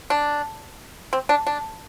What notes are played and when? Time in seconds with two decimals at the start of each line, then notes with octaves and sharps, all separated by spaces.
0.10 D4
1.13 C4
1.29 D4
1.47 D4